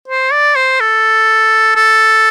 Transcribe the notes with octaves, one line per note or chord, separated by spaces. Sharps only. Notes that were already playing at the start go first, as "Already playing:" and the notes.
C5
D5
C5
A4
A4